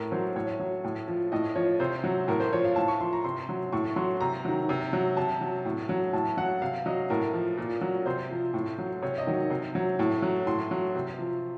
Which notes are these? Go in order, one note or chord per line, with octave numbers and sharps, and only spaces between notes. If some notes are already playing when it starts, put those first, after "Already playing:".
Already playing: A2 A#4
F#3 C5
A2 C#5
F#3
A2
F3
A2 D#5
F3 C#5
C3 C5
F#3
A2 A#4
C5
F3 C#5
F5
A2 A5
C#6
F3 C6
A#5
C3 C6
F#3
A2 C#6
F#3 C6
C3 A#5
D#3 F#3
C3
F#3
C3 A5
F#3
A2
F#3
A2 A5
F#3 F#5
C3 F5
F#3 D#5
A2 A#4
F3
A#2
F#3
C3 C5
F3
A2
F#3
C3 C#5
D#5
D#3 F#3
C3
F#3
A2
F#3
A2 C6
F#3
C3
F3